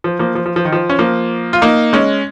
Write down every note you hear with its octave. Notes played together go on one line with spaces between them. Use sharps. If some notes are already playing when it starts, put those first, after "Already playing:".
F3
F3 A#3
F3
F3
F3
D#3
F3
C#4
F3 A#3
F4
A#3 D#4
G#3 C#4